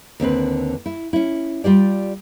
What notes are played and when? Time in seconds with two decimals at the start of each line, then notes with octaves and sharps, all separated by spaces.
0.20 D#2 D3 C4 B4
0.86 E4
1.13 C#4 E4
1.64 G3 F4 G4 D5